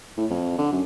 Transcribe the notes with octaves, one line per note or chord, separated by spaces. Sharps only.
A2
F2
D3
F#2